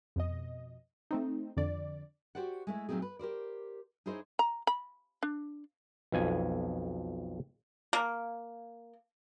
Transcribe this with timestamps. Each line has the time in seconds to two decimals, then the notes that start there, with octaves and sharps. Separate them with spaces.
0.16 F2 B2 D#5
1.11 A3 C4 D#4
1.57 F2 D3 D5
2.35 F#4 G4 C5 D5 F#5
2.67 G#3 A3 E4
2.89 A#2 F#3 A3 C4 D#4 G#4
3.02 B4
3.19 G4 A#4 C5 D5
4.06 D#4 E4 G#4 C5 C#5 D#5
4.39 A#5
4.67 B5
5.23 D4
6.12 B1 F2 G#5
7.93 A#3